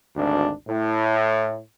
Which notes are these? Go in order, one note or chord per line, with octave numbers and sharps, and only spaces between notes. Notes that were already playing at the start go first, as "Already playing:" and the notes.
G#1 D2 D4
A2